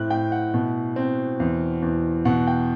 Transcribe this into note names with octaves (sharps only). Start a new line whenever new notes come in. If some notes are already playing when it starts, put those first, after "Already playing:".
Already playing: A2 C4 F#6
A2 G5
F#5
B2
C4
E2
E2
B2 F#5
G5